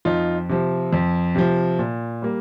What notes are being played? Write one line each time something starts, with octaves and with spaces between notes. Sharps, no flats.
F2 D#4 F4
C3 F3
F2
C3 F3
A#2
G3 A#3